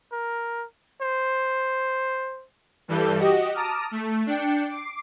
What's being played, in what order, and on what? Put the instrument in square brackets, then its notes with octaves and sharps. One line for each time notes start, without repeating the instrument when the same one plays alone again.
[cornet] A#4
C5
[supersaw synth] G2 E3 G3 A4 G6
F#4 G4 D#5
A5 A#5 D6 D#6 F6
A3
D4 G5 C#7
D6 C7